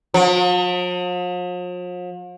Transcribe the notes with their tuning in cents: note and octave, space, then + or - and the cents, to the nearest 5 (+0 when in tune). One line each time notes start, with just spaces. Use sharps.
F3 +45